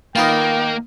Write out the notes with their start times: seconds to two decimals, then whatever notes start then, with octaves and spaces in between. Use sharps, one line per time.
0.16 D#3 A#3 F4 B4 D#5 G5